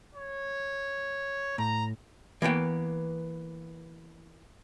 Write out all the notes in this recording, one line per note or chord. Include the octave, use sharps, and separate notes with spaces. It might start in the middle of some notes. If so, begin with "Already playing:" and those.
C#5
A2 A#5
E3 A#3 B3 G5